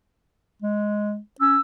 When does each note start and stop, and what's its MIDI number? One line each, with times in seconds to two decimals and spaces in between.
0.62 1.19 56
1.40 1.57 61
1.40 1.60 88